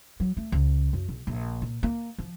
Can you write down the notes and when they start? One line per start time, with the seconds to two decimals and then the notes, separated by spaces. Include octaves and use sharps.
0.20 F#3
0.37 A3
0.52 C#2
0.93 F#2
1.09 B1
1.27 A#1
1.62 A#2
1.83 A#3
2.18 F3